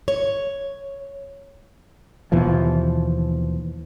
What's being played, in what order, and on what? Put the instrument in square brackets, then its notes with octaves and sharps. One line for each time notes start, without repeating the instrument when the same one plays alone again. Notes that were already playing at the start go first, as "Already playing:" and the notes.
[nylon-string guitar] C#5
[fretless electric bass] D#2 B2 E3 F3